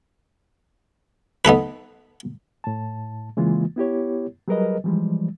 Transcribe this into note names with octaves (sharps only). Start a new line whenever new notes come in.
B3 D#4 A4 B4
A2 A5
C#3 E3 G#3 A#3 F4
B3 E4 G4 C#5
F#3 G3 G#4 A#4 B4 D#5
E3 F3 G3 G#3